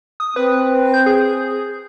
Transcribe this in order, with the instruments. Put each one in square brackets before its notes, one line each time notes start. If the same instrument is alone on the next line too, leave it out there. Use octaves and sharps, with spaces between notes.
[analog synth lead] D#6
[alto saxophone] C4 [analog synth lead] B4
[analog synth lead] G6
G#4